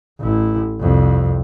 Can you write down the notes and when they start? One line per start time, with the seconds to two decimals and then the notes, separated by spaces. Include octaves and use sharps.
0.20 A1 E4
0.80 C2 F2